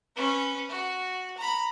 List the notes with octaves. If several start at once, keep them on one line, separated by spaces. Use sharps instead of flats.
C#4 B4
F#4
A#5 B5